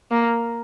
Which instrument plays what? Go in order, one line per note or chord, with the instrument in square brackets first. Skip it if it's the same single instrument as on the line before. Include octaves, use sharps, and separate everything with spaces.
[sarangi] A#3